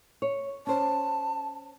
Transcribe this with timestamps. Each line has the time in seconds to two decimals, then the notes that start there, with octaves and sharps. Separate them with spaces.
0.22 C#5
0.67 C#4 C5 A5